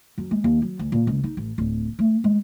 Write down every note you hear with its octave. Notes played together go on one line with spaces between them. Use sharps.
F#2
G#3
D#2
F#3
D2
A#2
C#2
D#4
A1
D1
A3
G#3